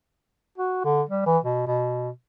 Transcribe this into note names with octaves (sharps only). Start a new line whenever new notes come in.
F#4
D3
G3
E3
B2
B2